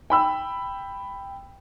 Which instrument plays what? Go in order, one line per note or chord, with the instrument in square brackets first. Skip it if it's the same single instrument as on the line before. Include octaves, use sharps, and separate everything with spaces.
[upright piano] G5 B5 E6